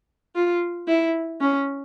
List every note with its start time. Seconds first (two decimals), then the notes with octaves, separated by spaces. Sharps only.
0.35 F4
0.88 E4
1.41 C#4